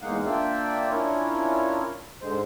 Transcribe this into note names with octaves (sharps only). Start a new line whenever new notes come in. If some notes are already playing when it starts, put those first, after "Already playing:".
E2 G#3 A#3 D#4 F5 F#5
A#3 D4 F4 D5 E5 G5
C#4 D4 E4 F4 A#4 C#5
G#2 D3 G#3 C5